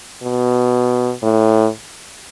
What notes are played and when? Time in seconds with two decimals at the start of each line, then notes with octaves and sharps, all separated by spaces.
0.23 B2
1.23 A2